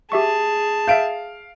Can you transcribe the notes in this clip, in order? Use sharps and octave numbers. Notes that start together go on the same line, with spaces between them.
G4 G#4 E5 A5 C#6
E5 F5 G6 D7